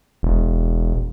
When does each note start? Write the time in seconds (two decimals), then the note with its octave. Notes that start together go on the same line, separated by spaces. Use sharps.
0.23 E1